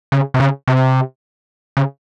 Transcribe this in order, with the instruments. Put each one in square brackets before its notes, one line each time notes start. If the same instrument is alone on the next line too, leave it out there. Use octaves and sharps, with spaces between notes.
[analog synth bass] C#3
C3
C#3
C3
C#3